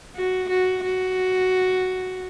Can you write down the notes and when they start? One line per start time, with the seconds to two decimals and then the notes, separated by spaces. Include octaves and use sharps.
0.16 F#4
0.49 F#4
0.84 F#4